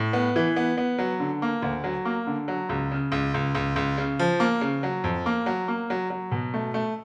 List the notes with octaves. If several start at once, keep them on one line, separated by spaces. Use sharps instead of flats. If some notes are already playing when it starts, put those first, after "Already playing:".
Already playing: A2
B3
E3
B3
B3
F#3
D3
A#3
D2
F#3
A#3
D3
F#3
C#2
C#3
C#2
C#2
C#2
C#2
C#3
F3
A#3
C#3
F#3
F2
A#3
F#3
A#3
F#3
F#3
B2
A3
A3